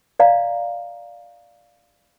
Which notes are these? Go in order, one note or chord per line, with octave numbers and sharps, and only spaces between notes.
D5 D#5 F5 A#5